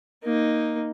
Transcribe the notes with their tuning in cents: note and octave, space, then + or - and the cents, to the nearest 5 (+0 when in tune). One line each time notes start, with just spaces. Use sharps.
A#3 +0 D#4 +0